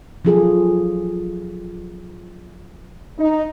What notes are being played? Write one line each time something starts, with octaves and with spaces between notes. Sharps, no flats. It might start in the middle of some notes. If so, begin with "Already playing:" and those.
F3 F#3 F4 G#4 A4
D#4